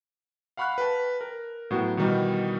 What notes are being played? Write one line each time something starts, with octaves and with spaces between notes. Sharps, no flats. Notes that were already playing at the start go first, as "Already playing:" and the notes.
F5 F#5 B5 C#6 F6 F#6
B4 G5 A5
A#4
A2 F#3 B3 F#4
B2 D#3 E3 G3 D#4 F#4